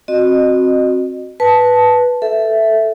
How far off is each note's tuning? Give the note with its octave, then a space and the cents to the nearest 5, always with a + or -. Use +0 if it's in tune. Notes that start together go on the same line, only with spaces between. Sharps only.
C4 +15 F#4 -10 D#5 -25
B4 +0 A5 -5
A4 +0 E5 +0